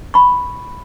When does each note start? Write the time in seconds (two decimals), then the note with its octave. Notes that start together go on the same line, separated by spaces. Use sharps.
0.14 B5 C#6